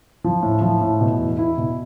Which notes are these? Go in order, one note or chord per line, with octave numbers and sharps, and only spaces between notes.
F3
A2
F3
A2
B2
E2
E4
B2